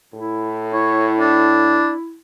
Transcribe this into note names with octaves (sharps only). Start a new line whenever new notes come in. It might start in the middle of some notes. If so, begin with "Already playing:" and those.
A2 E4
E4 C#5
D4